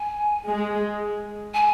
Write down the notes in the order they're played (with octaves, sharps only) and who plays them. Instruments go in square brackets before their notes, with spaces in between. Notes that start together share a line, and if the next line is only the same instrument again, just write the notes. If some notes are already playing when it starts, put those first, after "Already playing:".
Already playing: [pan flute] G#5
[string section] G#3
[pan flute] G#5